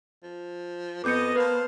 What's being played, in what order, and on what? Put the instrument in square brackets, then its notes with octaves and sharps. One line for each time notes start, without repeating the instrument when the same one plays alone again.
[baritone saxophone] F3
[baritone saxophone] F2 [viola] B3 [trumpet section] D#5 [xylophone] D6 G6 C#7
[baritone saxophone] A#3 [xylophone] B4 [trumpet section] C5 F5 A5